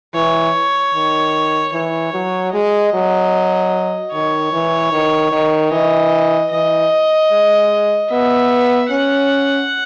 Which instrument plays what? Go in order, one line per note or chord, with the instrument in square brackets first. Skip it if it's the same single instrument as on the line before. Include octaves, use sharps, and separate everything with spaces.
[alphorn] E3 [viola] C#5
[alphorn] D#3
[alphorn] E3 [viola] C#5
[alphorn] F#3
[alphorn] G#3 [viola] D#5
[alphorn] F#3
[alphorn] D#3 [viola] C#5
[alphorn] E3
D#3
D#3
[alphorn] E3 [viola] D#5
[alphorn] E3 [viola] D#5
[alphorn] G#3
[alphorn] B3 [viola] E5
[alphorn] C#4 [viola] F#5